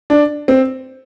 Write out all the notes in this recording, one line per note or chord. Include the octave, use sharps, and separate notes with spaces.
D4
C4